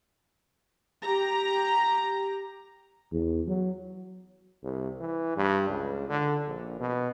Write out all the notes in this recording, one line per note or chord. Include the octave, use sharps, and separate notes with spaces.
G4 A#5
E2
F#3
C2
E3
G2
C#2
D3
A#1
B2